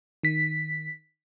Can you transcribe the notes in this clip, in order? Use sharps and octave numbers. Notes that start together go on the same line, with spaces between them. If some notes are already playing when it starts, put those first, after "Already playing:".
D#3 B6